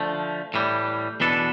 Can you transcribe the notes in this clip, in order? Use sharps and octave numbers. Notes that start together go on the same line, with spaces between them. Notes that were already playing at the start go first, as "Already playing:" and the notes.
Already playing: D3 F3 A3
A2 E3 G3
E2 B2 B3 D4 A4